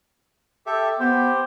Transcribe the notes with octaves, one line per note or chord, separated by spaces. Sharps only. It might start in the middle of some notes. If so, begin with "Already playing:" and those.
G4 A4 E5
B3 G4 C5